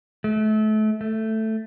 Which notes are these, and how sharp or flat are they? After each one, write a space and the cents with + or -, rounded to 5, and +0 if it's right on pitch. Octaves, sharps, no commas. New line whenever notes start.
A3 -30
A3 +5